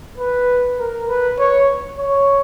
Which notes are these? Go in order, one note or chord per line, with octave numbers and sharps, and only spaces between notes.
B4
A#4
B4
C#5
C#5